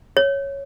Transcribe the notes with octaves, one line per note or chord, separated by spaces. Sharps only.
C#5